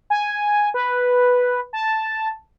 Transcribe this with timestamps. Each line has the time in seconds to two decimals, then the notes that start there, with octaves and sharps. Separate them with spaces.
0.10 G#5
0.74 B4
1.73 A5